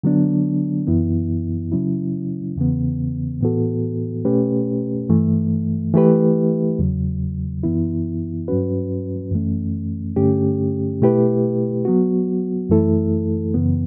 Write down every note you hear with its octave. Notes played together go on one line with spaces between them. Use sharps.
D3 F#3 B3 D4
F#2 E3 B3 E4
C#3 F#3 C#4 E4
E2 C#3 E3 B3
A2 E3 B3 F#4 A4
B2 A3 C#4 G4 B4
G2 E3 A3
E3 A3 E4 G4 B4
E2 C#3 F#3
F#2 E3 B3 E4
G2 F#3 C#4 F#4 B4
F#2 E3 A3 C#4
G2 D3 A3 C#4 G4
B2 A3 E4 G4 B4
F#3 B3 F#4
F#2 E3 A3 E4 A4
F#2 C#3 E3 B3